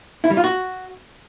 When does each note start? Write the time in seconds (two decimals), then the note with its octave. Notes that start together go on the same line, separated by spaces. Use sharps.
0.24 E4
0.30 G3
0.37 F4
0.44 F#4